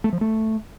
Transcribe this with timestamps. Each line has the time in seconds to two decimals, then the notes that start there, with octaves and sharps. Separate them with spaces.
0.04 A3
0.13 F3
0.21 A3